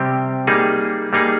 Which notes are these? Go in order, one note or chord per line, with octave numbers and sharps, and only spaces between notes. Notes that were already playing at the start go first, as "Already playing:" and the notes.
Already playing: C3 G3 C4 G4
G3 A#3 D#4 G#4
G3 A#3 D#4 G#4